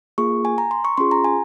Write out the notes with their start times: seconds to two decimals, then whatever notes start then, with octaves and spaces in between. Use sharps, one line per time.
0.18 A#3 F4 G#4 C#6
0.45 G#5
0.58 A#5
0.71 C6
0.85 C#6
0.97 C#4 F4 G#4 C6
1.11 A#5
1.24 G#5